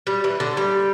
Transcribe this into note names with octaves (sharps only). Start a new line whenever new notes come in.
G3
E3
D3
G3